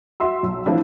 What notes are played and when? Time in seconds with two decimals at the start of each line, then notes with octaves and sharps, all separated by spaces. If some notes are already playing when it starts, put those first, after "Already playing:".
0.20 F#4 E5 C6 E6
0.43 B1
0.66 E3 F3 C4 D4 E4